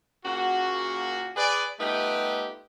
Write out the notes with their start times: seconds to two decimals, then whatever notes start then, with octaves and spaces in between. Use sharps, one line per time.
0.24 A#2 C#3 A#3 F#4
1.36 G#4 B4 D5
1.80 G3 A3 B3 D#4 F4 G4